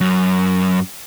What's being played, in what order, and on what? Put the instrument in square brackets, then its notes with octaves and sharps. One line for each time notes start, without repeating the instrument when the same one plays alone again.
[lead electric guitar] F#2